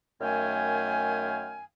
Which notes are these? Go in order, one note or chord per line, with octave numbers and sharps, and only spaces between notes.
F#2 D#3 A3 F5 G5 G#5